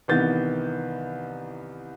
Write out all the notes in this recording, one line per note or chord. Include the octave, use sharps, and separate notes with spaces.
C2 D#3 E3 B3 G6 A6